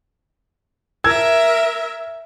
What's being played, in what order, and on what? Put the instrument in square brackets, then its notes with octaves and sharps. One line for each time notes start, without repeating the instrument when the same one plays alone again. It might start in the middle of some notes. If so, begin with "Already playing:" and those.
[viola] A#4 E5 [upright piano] E6 G#6